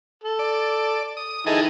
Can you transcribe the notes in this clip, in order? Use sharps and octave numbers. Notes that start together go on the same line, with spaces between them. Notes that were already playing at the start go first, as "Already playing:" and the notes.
A4
D5
D#6
D#3 E3 G#4 A4 D#5